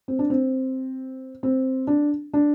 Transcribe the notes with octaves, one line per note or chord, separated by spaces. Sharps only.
C4
D4
C4
C4
D4
D4